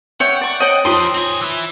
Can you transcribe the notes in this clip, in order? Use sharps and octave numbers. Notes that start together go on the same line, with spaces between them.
C#5 E5 F#5 G5
D5 C#6
C5 C#5 D#5 G5
F2 D#4 F4 C5 C6 D#6
C4 G#4
E3 E4